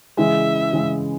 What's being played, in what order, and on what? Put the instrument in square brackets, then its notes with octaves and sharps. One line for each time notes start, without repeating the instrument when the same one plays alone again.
[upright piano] C#3 E3 G#3 [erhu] E5
[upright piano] C#3 E3 G#3